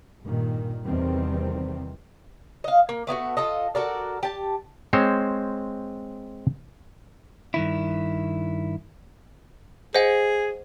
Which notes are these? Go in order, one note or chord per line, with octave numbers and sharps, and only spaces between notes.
G2 A#2 D#3
E2 C3 D#3 G3 C4
D#5 F5
A#3
A3 B3 E4 F#4
F4 A4 D#5
F#4 A4 A#4 D5
G4 A5
G#3 C4 C5 C#5
G2 D#3 E4
G#4 C5 D#5 F#5